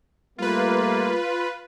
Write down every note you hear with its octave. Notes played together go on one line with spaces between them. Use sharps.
G3 A3 A#3 F4 B4